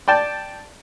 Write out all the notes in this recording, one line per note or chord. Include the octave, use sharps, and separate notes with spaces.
D5 G5 A5